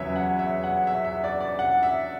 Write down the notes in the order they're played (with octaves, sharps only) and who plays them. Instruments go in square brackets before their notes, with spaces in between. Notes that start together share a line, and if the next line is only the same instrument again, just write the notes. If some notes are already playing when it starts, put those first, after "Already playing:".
Already playing: [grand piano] E2 C#3 F#3 B4 C#5 E5
F#5
E5
F#5
E5
E5
D5
D5
F#5
E5